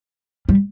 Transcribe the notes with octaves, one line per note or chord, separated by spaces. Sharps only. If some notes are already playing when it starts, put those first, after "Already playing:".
G3